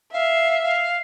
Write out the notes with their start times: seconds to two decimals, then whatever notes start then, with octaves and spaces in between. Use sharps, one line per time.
0.13 E5 F5
0.63 F5